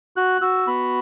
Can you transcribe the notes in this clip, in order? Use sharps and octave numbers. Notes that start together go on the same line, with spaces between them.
F#4 F#6
F#4 E6
B3 B5